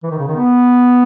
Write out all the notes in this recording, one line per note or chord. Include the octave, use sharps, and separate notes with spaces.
E3
D#3
C#3
D#3
B3